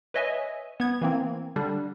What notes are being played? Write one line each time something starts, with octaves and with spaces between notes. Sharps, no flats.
B4 C#5 D#5 E5 G#5
B3 G#6
E3 A#3 C4
D3 G3 D4